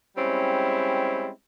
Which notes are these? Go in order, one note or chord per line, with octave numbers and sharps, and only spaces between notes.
G3 G#3 C4 C#4 E4